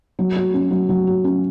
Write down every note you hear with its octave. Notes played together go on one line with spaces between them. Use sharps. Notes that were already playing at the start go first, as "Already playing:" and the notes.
F#3
F#4
C#4
F#3
F#3
F#4
C#4